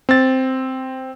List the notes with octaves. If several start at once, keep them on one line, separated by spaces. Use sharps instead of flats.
C4 A6